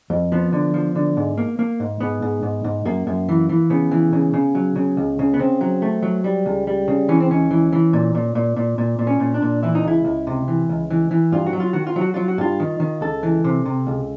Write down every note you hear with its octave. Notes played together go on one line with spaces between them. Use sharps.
F2
F3 B3
D3
F3
D3
G#2
A#3
A#3
G#2
G#2 B3
G#2
G#2
G#2
F#2 A#3
F#2
E3
E3
C#3 B3
E3
C#3
C#3
F#3
C#3
C#2
C#3
B3
C#3 C4
F#3
A3
F#3
G3
C#2
G3
C#3
E3 C#4
C4
C#2 C#4
E3
E3
A#2
A#2
A#2
A#2
A#2
A#2
C#4
A#2
D4
A#2
E3 E4
D#4
C#2 E4
C#2
C3
E3
C#2
E3
E3
G2 F4
F#4
F#3
F4
D#3 F#4
F4
F#3
F#4
F#3 F4
F#4
G2 F4
D#3
D#3
C#2 A4
E3
C3
C3
C#2